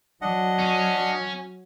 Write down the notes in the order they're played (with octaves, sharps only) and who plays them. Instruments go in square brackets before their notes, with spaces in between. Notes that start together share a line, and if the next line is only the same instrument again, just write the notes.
[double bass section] F#3 [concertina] D4 D#5 F#5
[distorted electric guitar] C#4